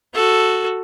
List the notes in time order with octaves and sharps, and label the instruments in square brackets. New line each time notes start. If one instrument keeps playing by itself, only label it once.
[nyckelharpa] F#4 A4